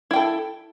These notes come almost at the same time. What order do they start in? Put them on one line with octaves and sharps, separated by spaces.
E4 G5 A4